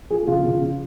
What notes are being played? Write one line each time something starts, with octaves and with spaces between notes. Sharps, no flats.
F3 G#4
C#3 F4
C#3
F3